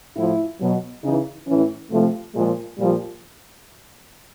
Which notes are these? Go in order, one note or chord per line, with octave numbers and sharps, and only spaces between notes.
A2 F3 E4
B2 F#3
C#3 E3 D#4
A2 E3 C#4
C3 F3 A3
A#2 F3 G#3
A#2 F3 G3